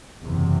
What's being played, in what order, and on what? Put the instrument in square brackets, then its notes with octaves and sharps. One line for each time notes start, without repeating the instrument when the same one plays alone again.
[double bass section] F#1 E2 C3